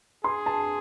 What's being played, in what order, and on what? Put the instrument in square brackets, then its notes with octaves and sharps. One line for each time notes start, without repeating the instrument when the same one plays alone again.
[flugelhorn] G#4 [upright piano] C6
[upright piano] A5